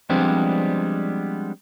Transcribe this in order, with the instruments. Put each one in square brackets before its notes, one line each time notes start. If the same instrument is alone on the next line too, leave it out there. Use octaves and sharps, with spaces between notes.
[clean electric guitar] F3 G3 G#3 B3 C4 D4